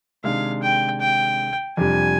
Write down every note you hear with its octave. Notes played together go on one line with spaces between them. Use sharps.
C3 D#3 G#3 D4 G#4 F5
G5
G5
F2 C3 G3 D4 G4 G#5